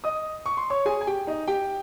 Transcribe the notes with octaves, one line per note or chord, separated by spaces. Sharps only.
D#5 D#6
C#6
C6
C#5 C#6
G#4 G#5
G#5
G4 G5
D#4 D#5
G4 G5